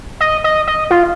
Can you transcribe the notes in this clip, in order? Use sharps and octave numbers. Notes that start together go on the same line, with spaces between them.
D#5
D#5
D#5
F4